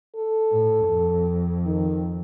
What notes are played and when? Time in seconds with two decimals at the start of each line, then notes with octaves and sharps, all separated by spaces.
0.16 A4
0.52 A2
0.88 F2
1.65 D#3